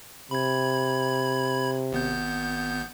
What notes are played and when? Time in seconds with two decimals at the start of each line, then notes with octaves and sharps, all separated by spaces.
0.31 C3 B5 G#6
1.92 G#1 B3 G6